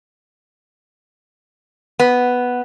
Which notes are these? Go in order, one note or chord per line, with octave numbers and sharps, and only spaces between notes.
B3